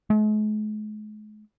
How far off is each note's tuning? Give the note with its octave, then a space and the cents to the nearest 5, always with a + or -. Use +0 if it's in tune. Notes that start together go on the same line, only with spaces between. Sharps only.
G#3 +45